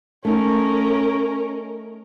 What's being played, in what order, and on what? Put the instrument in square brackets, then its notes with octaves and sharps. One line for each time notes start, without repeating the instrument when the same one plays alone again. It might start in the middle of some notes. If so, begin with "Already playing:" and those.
[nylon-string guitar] A3 D#4 [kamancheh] C#4 A#4